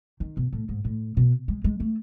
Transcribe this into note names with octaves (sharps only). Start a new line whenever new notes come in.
D#3
B2
A2
G#2
A2
B2
G#3
G#3
A3